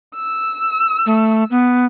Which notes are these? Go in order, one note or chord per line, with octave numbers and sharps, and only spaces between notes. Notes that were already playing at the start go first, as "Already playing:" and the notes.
E6
A3
B3